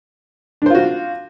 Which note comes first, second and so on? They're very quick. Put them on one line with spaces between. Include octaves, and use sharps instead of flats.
D4 C5 F4 F#4